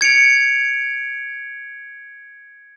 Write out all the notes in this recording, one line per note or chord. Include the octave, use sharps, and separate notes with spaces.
G#6 C#7 D7 F7